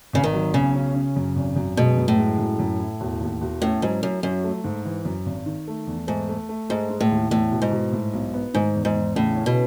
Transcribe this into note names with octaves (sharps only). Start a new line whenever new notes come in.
G#1 C#3
D#3
F#3
B1 C#3
C#4
C#4
F#2
G#1
F#2
B2 G#3
F#2
A2
G#3
F#2
F#2
E4
E1
D#2
E1
A2 C#4
G#2 F#3
F#2 F#3
F#2 F#3
A3
G#2
E3
F#2
G#1
D#3
A3
E2
G#2 A3
A3
A3
G#2 G#3
G#3
A2
D#2
E2 A2
B2
G#2
B2
A2
B1
B3
G#2 D#3
E2
G#2
E2
A2 C#3
C#4
B2